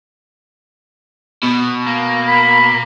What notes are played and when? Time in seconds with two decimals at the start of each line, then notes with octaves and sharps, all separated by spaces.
1.43 B2
1.86 A#3
2.28 B5